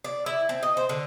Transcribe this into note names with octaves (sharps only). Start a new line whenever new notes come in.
D5
E4
C4
D#5
C5
D3